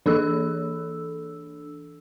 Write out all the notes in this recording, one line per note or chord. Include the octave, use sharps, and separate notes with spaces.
E3 D4 A4 E6